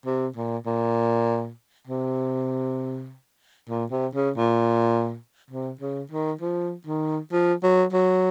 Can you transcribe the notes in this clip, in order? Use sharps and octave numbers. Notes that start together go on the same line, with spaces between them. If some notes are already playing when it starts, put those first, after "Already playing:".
C3
A#2
A#2
C3
A#2
C3
C#3
A#2
C3
C#3
D#3
F3
D#3
F3
F#3
F#3